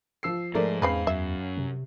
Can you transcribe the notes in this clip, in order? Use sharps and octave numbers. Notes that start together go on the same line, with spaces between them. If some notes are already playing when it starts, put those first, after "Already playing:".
F3 E6 C7
G#2 F3 A3 A#4 D5
E2 C#3 C4 B4 F5 B5 C7
F#2 E5
C3